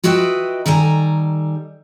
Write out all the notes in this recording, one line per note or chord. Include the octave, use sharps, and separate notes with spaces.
F4 F#4 B4 D#5 E5 G5
D#3 G3 A4 G#5 A#5